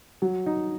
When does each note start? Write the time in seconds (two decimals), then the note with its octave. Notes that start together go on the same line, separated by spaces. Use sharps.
0.22 F#3
0.46 D#4